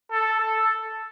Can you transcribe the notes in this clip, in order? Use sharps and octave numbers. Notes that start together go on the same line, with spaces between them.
A4
A4